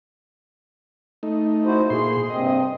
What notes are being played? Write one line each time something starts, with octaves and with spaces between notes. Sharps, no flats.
A3 D#4
E4 F#4 C5
A#2 G#4 C6
G2 C3 C4 D#5